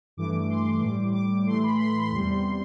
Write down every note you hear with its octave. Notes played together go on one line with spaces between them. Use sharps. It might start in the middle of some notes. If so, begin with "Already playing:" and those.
G2 E3 A3 D6
C6
A2 G3 D6
D6
A2 E3 A3 C6
B5
C6
C6
C6
E2 C3 G3